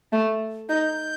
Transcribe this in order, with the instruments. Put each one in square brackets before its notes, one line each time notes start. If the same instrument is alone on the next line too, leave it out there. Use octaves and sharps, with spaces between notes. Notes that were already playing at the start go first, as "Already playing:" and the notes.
[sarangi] A3
[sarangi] D#4 [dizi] G6